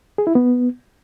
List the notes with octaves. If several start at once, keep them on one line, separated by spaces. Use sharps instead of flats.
G#4
E4
B3